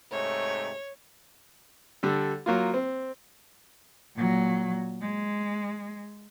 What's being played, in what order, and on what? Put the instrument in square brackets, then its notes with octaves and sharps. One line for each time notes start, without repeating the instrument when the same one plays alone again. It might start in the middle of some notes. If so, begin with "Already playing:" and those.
[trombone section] G#2 C3 A3 [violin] C#5
[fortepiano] D3 G3 A4
F#3 A#3 F4
C4
[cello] A#2 F#3
G#3